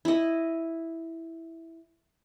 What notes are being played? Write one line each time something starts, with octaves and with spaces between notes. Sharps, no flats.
E4 D#5